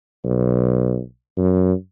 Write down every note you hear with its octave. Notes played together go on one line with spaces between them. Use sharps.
B1
F#2